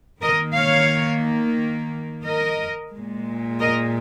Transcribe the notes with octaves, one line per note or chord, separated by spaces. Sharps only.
D#3 A#3 A#4 D#5
C#5 F5
A#4 D#5
A#2 G#3
A#4 D#5